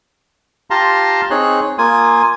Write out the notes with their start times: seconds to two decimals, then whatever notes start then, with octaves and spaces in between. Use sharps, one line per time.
0.70 F4 G4 F5 A5 A#5 C6
1.30 C4 D#4 G#4 C#5 F#6
1.78 A#3 F4 G#5 D#6